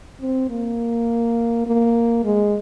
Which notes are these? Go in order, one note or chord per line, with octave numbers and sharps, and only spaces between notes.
C4
A#3
A#3
G#3